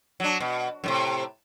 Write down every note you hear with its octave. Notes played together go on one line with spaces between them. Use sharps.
F#3 D4
B2
F#2 A2 C3